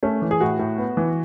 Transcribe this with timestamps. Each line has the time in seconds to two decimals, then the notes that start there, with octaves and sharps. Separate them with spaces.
0.03 A3 C#4
0.22 E3
0.31 G#4
0.41 A2 F#4
0.59 A2
0.78 B3
0.97 E3